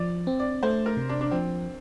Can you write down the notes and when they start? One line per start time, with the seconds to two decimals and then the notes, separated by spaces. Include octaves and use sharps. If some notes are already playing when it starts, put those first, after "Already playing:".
Already playing: F3 D5
0.27 C4
0.39 D5
0.63 A3 C5
0.86 A#4
0.97 C3
1.09 D4
1.21 D4
1.31 F3 C4